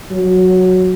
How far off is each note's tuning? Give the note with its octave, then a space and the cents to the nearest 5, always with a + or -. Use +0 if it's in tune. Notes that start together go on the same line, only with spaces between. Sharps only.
F#3 -5